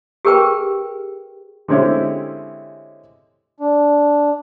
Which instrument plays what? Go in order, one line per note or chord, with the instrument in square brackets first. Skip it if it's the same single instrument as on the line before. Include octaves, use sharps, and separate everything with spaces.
[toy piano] G4 G#4 A#4 B4 G5
[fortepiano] D3 G#3 C4 C#4 E4 G4
[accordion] D4